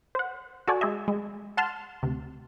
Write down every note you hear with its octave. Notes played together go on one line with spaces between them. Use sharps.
C5 F#5
F#4 A4 D5 G#5
G#3 G#4 D#5 E5
G#3
F#5 A5 C6 F6
D2 C3